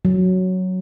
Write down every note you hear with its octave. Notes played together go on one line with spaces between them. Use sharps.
F#3